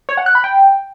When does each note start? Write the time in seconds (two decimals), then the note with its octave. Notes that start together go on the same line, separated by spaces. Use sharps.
0.09 C#5
0.17 F#5
0.26 F#6
0.35 B5
0.44 G5